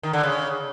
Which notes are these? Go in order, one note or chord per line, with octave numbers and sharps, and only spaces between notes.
D#3
D3
C#3